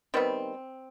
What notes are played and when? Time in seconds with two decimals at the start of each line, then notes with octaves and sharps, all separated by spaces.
0.14 D#3 G3 B3 C4